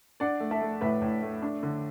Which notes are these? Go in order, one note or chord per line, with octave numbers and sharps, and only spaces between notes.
D4 D5 F#5
A3
E5 A5
A3
A2 B4 E5
A2
A3
D4
D3